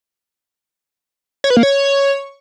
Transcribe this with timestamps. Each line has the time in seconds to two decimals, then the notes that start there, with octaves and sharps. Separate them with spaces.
1.44 C#5
1.50 B4
1.57 A#3
1.63 C#5